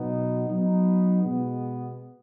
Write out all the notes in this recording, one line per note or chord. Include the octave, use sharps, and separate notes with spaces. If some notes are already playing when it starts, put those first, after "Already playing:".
Already playing: B2 F#3 B3 D#4
F#3 B3 D#4
B2 G#3 B3